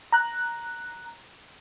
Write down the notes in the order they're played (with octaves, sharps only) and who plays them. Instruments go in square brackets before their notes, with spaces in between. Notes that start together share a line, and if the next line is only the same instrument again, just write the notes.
[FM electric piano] A#5 F#6